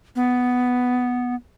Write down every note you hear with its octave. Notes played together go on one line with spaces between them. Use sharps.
B3